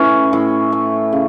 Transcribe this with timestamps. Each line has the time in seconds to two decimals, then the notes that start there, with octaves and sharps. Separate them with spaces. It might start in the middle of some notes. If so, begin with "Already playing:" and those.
Already playing: A2 E3 C#4 E4
0.33 A2
0.72 A3
1.13 C#3